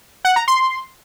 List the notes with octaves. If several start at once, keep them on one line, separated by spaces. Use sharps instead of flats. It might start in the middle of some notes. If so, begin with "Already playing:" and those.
F#5
A#5
C6